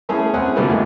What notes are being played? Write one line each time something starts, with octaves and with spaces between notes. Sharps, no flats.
E3 A3 C#4 E4 G#4
C4 C#4 E4 G#4 F#5 G#5
A#2 D3 F#3 G3 A3 B3
C2 F2 G#2